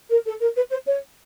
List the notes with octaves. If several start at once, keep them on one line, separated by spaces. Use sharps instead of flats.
A#4
A4
A#4
B4
C5
C#5